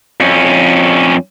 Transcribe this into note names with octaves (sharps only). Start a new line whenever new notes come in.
F2 C#4